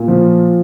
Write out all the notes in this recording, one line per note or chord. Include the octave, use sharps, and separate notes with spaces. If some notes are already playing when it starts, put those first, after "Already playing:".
Already playing: A#2
F3